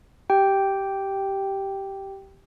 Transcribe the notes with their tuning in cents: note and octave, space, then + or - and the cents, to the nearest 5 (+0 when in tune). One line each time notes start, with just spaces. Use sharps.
G4 -10 G5 +0